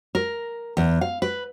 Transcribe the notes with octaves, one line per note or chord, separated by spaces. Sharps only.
A#4
E2
F5
B4